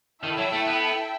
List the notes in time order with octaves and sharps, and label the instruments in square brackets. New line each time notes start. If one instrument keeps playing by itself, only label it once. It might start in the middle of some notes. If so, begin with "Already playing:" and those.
[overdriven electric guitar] D#3 [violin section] E4 A4 E5 G5
[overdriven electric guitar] F#3
A3
B3